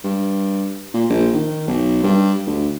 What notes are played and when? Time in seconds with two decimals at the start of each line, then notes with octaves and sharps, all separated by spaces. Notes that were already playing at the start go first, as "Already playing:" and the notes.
0.04 G2
0.94 A#2
1.10 A#1
1.34 D#3
1.68 B1
2.04 G2
2.47 D2